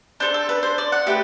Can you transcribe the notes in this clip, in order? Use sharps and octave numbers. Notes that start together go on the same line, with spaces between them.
D4 A4 C5
A4
B4
C5
D5
F#5
A3 E4 G4 B4